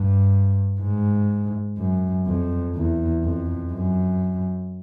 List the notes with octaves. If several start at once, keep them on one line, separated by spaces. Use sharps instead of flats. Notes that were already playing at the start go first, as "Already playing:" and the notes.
Already playing: G2
G#2
F#2
F2
E2
F2
F#2